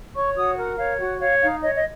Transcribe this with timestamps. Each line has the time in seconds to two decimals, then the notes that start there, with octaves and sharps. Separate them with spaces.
0.15 C#5 C#6
0.36 F#4 D#6
0.57 A#4 F#5
0.78 C#5 F5
0.99 F#4 F#5
1.20 C#5 F5
1.41 D#4 F5
1.63 C#5 D#5
1.75 D#5